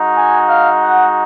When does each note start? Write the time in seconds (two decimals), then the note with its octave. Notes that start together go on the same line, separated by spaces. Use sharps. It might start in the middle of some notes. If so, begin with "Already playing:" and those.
Already playing: G#3 D#4 F#4
0.17 G#5
0.49 F5
0.82 F#5